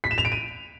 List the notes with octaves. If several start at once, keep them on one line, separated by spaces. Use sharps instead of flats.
B6
E7
F7
D7
D#7